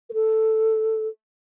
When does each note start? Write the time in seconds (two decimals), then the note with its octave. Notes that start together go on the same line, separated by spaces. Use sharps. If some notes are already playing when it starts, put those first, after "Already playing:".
0.10 A#4
0.13 A4